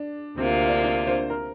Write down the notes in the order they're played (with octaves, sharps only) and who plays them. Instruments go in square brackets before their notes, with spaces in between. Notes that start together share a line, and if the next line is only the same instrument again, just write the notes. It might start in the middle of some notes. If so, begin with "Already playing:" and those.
Already playing: [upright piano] D4
[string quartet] D2 C3 A#3 F4 [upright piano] C4
[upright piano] D4
D4
C5
A#4